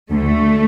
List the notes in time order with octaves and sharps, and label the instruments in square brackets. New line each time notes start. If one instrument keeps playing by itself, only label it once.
[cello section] D2 D3 A3